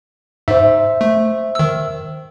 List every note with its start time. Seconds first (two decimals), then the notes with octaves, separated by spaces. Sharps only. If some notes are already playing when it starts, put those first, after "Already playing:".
0.48 G#2 C5 E5
1.01 A3
1.55 D#3 E6